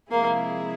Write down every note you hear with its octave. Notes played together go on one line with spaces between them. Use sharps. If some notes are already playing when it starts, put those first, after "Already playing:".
C3 F3 G#3 A#3 E4 G#4